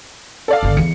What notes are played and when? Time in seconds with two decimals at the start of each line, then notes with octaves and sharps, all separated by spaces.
0.48 A4 D5 F5
0.63 G1 D3
0.77 E2 E3 C#7